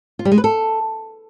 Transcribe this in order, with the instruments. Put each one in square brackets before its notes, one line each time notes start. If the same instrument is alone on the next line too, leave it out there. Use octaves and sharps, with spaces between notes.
[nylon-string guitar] F4
G3
G#3
B4
A4